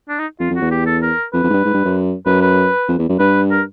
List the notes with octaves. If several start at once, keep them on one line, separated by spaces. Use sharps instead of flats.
D4
D#4
F2 F4
F2
F#4
E2
G4
A4
A#4
F2 B4
F2
G#2
G2
G#2
G2
F#2
F#2 B4
B4
F2
E2
F#2
G2 B4
A#4